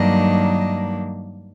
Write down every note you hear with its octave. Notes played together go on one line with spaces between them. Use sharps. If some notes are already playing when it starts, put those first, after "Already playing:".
Already playing: G2 D#3 F#3 A#3 D4 D#5